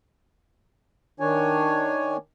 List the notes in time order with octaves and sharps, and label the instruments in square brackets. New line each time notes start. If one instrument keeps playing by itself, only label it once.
[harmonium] D#3 D4 C#5 G#5